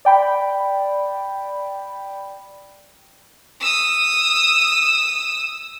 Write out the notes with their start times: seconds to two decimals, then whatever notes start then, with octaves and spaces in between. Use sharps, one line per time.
0.05 D5 G5 B5
3.61 D#6 E6